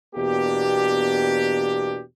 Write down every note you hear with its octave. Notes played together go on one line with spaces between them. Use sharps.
E2 B2 A#3 D4 G4